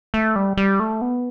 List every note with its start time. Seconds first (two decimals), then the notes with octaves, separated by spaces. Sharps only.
0.14 A3
0.36 G3
0.57 G3
0.80 A3
1.02 B3